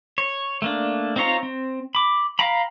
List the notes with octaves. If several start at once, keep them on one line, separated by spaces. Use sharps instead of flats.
C#5
A3 A#3 D4
C4 D#4 F4 C#5 A#5
C4
B5 D6
F5 G5 A#5 B5